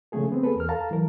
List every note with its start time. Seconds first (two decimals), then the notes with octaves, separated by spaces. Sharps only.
0.12 C#3 F3 A3 G#4 A4
0.32 B3 C4
0.43 A#3 G#4 A4 B4
0.56 E2 A#4 F6
0.69 A4 F5 A5 A#5
0.91 E3 F#3 A#4